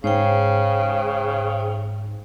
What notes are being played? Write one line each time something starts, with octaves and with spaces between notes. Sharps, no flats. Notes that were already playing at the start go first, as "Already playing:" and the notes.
G#2 C#3 C5 G5